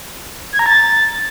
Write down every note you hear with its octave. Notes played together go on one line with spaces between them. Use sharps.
G#6
A#5
A6